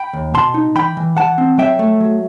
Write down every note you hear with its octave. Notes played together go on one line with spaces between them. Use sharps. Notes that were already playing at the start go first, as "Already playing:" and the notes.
Already playing: G5 B5
D#2
B2 A5 C6
D#4
E3 G5 B5
E3
E3 F#5 A5
C4
F#3 E5 G5
A3
F#3